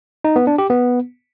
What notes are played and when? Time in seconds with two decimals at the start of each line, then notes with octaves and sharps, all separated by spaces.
0.24 D#4
0.36 B3
0.47 D4
0.58 G4
0.70 B3